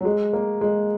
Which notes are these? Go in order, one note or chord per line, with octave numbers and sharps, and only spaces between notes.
F#3
G#3
A#3
G#3